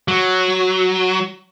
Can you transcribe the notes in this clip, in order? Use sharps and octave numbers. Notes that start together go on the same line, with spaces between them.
F#3